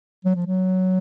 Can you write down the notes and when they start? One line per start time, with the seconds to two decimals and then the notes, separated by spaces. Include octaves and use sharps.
0.25 F#3
0.36 F3
0.46 F#3